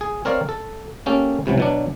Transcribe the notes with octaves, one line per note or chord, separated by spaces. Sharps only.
G#4
C4 A#4 C#5 D5 F5
A4
A#3 C#4 G4 A4
C#2 C3 E3 F#3
B2 F#3 D4